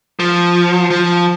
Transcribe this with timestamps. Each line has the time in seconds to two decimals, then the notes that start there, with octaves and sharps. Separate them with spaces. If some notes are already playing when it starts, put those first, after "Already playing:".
0.19 F3
0.90 F3